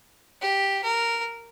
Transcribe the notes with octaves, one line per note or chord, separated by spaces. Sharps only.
G4
A#4